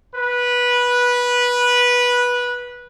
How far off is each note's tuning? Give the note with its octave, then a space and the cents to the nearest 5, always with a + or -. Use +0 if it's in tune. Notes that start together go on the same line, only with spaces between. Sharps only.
B4 -15